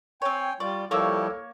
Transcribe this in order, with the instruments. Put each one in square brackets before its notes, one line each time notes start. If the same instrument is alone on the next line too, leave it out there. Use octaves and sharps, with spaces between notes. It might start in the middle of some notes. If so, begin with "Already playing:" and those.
[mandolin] C4 C#5 [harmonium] G5 G#5
[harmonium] G3 F4 [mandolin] D5 [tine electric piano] C#6
[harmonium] F3 G3 E4 [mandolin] A#3 C#5 [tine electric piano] A4 D6 E6